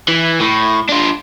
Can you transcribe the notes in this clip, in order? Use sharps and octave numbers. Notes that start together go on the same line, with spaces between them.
E3
A2
D4 F4